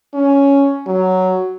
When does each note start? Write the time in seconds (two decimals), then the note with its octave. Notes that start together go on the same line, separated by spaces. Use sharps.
0.14 C#4
0.87 F#3